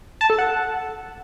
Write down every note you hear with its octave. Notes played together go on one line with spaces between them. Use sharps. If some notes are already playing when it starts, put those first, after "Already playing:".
A5
A4
F#5